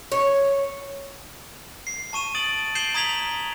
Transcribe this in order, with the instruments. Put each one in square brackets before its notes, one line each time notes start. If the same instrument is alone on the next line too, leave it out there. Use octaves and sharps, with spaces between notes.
[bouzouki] C#5
[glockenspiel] C7
A5 C#6 D#7 E7
D#6 A6 D7 F#7
G6 C7 D7 E7 F#7 G7
A#5 D#6 G#6 B6 F7 F#7
F7